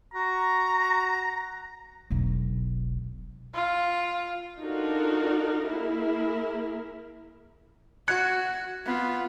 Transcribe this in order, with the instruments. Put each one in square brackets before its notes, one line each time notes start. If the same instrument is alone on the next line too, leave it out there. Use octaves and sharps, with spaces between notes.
[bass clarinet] F#4 [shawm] A#5
[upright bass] E1 B1
[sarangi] F4
[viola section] D4 D#4 F4 F#4 A4 A#4
A#3 E4 G#4 A#4
[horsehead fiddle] F#4 [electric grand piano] F#6 G#6 C#7
[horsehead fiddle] B3 F4